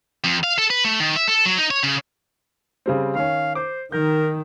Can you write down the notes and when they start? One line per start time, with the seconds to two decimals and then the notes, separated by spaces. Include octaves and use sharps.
0.24 F2
0.44 F5
0.58 A4
0.70 B4
0.84 A3
1.00 D#3
1.16 E5
1.28 A4
1.46 F#3
1.58 D#4
1.71 C#5
1.84 C#3
2.86 C#3 G3 C4
3.15 D#3 C#4 F5
3.55 C5 D6
3.92 D#3 A#4 G6